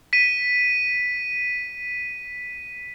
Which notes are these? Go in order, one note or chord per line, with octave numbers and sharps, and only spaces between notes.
B6 D#7